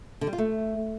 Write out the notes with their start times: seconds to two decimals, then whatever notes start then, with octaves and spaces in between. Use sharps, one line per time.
0.21 D3
0.27 G3
0.33 F4
0.38 A3